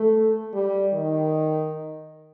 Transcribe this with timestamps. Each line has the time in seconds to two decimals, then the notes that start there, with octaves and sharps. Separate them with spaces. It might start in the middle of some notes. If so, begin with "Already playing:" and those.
Already playing: A3
0.53 G3
0.93 D#3